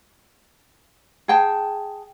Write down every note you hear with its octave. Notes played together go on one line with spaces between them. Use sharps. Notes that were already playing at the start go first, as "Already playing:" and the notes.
G#4 G5 A5